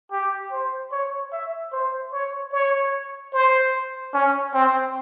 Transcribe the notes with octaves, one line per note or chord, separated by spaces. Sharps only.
G4
C5
C#5
E5
C5
C#5
C#5
C5
C#4
C4